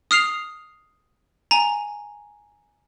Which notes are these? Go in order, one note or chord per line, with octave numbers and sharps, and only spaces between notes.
D#6 F6 C7 F7
G#5 A#5